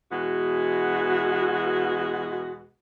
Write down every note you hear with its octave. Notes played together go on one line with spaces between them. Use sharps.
E2 B2 G#3 F#4